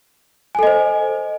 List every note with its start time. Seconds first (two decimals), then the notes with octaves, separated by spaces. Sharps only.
0.55 G#5
0.59 A4
0.63 D#5
0.67 C5